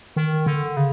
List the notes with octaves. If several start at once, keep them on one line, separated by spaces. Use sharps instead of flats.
D#3
D3
C#3